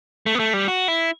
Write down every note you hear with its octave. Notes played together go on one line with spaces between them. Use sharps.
A3
B3
A3
G3
F#4
E4